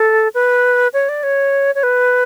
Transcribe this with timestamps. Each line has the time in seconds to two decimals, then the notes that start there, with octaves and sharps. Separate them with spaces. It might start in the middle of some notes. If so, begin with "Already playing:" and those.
Already playing: A4
0.34 B4
0.93 C#5
1.09 D5
1.23 C#5
1.75 C#5
1.83 B4